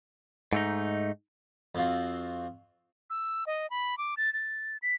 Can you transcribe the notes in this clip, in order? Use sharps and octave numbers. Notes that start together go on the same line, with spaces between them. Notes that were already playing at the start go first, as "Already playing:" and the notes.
G#2 A3 D#4
F2 C4 F4 F#4
E6
D#5
B5
D6
A6
A6
B6